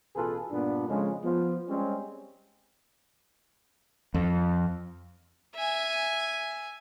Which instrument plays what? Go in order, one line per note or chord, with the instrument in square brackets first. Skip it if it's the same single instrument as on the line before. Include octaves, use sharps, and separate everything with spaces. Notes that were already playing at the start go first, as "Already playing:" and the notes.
[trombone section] A1 B2 F4 G#4 A4 B4
G2 A#2 B3 D4
F2 C#3 F3 G#3
F3 B3
G3 G#3 C4 C#4
[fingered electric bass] F2
[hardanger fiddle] E5 G#5